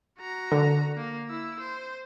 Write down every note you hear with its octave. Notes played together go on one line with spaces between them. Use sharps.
F#4 A#5
D3
A#3
E4 E6
C5